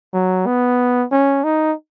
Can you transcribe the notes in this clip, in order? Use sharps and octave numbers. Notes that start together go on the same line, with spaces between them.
F#3
B3
C#4
D#4